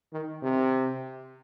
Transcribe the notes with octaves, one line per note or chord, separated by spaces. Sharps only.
D#3
C3